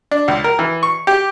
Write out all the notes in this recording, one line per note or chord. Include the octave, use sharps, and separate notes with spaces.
D4
C#2
A#4
E3
C#6
G4